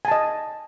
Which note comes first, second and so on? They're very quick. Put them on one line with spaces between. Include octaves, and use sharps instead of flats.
G#5 A5 D#5